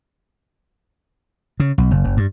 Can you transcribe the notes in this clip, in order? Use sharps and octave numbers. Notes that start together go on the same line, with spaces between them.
C#3
B1
F#1
F#1
G2